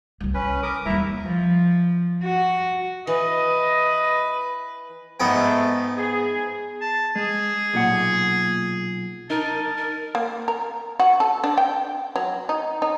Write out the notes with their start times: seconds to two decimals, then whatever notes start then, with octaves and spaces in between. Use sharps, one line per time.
0.20 C2 G3
0.34 C#4 E4 B4
0.63 A#4 D6 D#6
0.86 D#2 G3 E4 E5 A#5
1.22 F3
2.23 F#4
3.07 E3 B4 D#5
5.20 G#2 G#3 A3 B3 G5
5.97 G#4
6.81 A5
7.16 G#3 G#4
7.73 B1 A#2 F#5
9.30 D#4 A#4 A5
9.78 A#4
10.15 A#3
10.48 A#4
11.00 F#4
11.20 A4
11.44 D4
11.58 G5
12.16 F#3
12.49 D#4
12.82 D#4